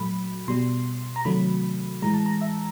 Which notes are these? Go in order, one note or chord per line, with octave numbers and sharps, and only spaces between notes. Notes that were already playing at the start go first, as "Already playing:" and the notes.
Already playing: A#2 F#3 A3 B5
B2 G3 C6
A#5
C3 D#3 F#3 A3 B5
A2 E3 G#3 A#5
A5
A#5
E5